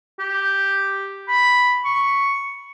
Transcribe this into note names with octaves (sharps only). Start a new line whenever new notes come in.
G4
B5
C#6